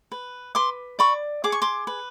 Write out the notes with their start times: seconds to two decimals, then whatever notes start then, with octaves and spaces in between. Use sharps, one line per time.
0.12 B4
0.55 B4 C6 D6
0.99 D5 B5 C#6
1.44 G#4 D6
1.52 C#6
1.62 C6 D6
1.87 B4